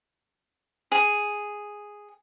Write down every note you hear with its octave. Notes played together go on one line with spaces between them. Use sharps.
G#4